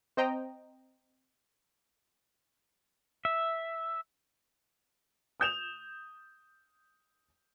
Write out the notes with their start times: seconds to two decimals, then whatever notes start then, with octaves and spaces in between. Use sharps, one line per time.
0.17 C4 C5 D#5 G5 A#5
3.25 E5
5.40 D#6 G6 E7 F7